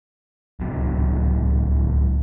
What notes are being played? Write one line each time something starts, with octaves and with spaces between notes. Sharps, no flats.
D1 C#2 F#3 B3